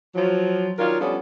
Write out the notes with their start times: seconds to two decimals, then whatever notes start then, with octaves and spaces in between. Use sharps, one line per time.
0.15 F3 F#3
0.78 D#3 F#3 D4 F4 A#4 C#5
1.00 F3 G3 B3 C#4 D4 A4